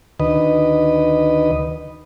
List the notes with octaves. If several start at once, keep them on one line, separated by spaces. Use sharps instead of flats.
D2 D#3 B4 D#5